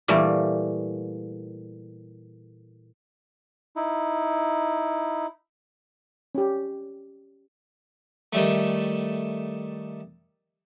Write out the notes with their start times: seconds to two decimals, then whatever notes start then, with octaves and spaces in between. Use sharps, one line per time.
0.08 A#2 E3 G3 A3
3.76 D#4 E4
6.35 C#4 G4
8.33 D#3 G3 A3